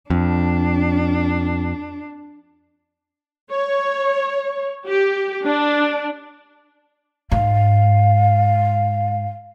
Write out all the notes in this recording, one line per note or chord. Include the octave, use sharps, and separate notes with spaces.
F2 D4
C#5
G4
D4
G#2 F5